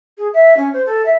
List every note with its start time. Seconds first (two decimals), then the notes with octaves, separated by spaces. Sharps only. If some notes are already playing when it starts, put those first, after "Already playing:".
0.18 G#4
0.34 E5
0.57 C#4
0.73 C5
0.86 A4
1.05 E5